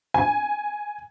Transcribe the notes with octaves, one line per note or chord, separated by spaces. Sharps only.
G#5